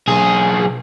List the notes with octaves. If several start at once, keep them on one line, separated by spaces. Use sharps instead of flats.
B1 G#4